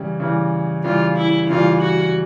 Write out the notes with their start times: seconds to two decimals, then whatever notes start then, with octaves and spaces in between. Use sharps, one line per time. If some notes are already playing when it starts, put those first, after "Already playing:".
Already playing: C#3 E3 G3
0.20 C#3 E3 G3
0.84 C#3 E3 G3 F4
1.17 E4
1.49 C#3 E3 G3 F4
1.82 F#4